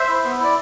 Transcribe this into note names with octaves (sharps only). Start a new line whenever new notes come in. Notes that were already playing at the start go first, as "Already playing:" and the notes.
Already playing: C5 E5
E4
B3
E4 D5